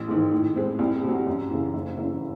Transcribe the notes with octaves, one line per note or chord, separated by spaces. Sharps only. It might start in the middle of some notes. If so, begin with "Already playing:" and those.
Already playing: A1
G#2 D#3
A2
G#3 C4
C2
C3
F#3
F#2
C#3 E3
F#1
F#2 C#3 E3